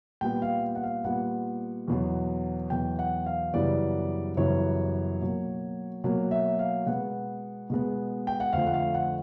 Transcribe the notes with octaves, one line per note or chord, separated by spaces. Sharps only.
A#2 G3 B3 G5
F5
F#5
F5
A#2 G3 B3 F#5
E2 B2 F#3
E2 B2 F#3 G5
F#5
F5
F#2 C#3 E3 G3 B3 D5
F#2 C#3 E3 G3 B3 C#5
B2 F#3 A#3
B2 F#3 A#3
E5
F5
B2 G#3 B3 F#5
B2 G#3 B3
G5
F#5
F2 D3 F3 A3 F5
F#5
F5
F#5